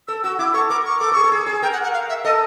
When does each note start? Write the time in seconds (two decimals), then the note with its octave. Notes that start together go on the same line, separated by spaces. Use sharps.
0.08 A4 E6
0.24 F#4 E6
0.39 E4 D6
0.54 A4 C#6
0.70 A#4 D6
0.85 C#6
0.99 A4 D6
1.12 G#4 A4 C#6
1.24 A4
1.32 G#4
1.46 G#4
1.62 A#4 G5
1.73 F#5
1.83 F#5
1.93 F5
2.09 E5
2.24 A4 D#5